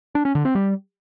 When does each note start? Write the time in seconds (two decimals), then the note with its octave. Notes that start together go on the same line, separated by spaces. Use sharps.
0.15 D4
0.25 C#4
0.35 D3
0.45 C4
0.55 G3